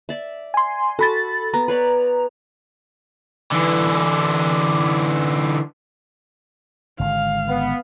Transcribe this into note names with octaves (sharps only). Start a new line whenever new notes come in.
D5 E5
G#5 C6
F#4 A4 B5 A6
B3 A#5
B4 C#5 D5
D3 E3
G#1 D3 G#3 F5
B3